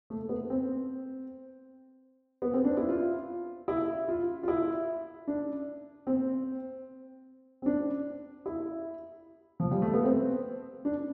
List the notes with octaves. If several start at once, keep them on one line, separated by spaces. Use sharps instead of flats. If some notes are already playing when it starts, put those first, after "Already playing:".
A3
B3
C4
B3
C4
D4
E4
F4
E4
F4
F4
E4
D4
C4
C4
D4
E4
F3
G3
A3
B3
C4
D4